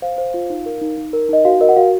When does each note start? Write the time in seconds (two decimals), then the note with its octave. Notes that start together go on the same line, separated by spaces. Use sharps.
0.02 C5 F5
0.18 C5
0.34 F4
0.50 D#4
0.66 A#4
0.82 D#4
0.98 D#4
1.13 A#4
1.29 D#4 D#5
1.45 F#4 F5
1.61 A#4 D#5
1.69 F#5
1.76 F#4 F5